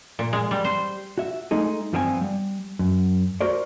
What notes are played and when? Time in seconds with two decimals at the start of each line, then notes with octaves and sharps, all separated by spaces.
0.19 A#2
0.33 G#3
0.51 G3
0.65 C5
1.18 F#4 E5
1.51 G#3 A3 D#4 G#4
1.93 G2 F3 B3 C4 G#4 G#5
2.21 G3
2.79 F#2
3.41 F#4 A#4 C5 D5